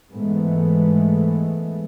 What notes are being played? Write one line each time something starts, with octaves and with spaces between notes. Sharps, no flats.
G#2 E3 G#3 A3 B3